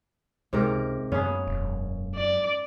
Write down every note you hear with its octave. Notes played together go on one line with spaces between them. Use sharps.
C#2 G#2 C3 A#4
F#2 F#3 A#3 B3 C#4 G#4
E1
D5